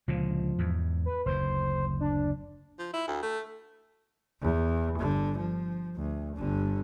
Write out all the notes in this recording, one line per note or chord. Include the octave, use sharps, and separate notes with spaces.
C#2 A#2 D3 F3
E2 G#2
B4
F#1 D2 C5
D4
F3
E4
D2
A3
E2
G1 D3
F3
D2
G1 D3